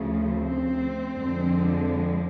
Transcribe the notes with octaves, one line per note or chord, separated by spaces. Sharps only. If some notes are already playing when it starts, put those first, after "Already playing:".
Already playing: D2 C#3 F3 A3
C4
F2 D3 F3 G#3